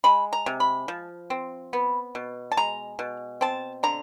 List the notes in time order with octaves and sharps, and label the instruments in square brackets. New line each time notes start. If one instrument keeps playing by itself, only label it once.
[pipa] G#3 B5
A#5
C3
B5
F3
C4
B3
B2
A5
G#3 A#5
B2
C4 A5
D3 A#5